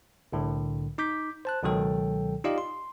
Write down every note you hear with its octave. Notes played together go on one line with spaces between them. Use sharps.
C2 A2 D3
D#4 D6 G6 B6
C5 A5 F#6
C#2 B2 D#3 F#3 A4 G5
D#4 F4 G4 D5 D#5 F5
C6